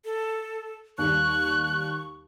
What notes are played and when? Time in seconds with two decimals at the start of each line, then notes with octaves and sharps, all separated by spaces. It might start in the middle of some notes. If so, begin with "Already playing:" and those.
0.05 A4
0.98 D#2 G3 C#6 F#6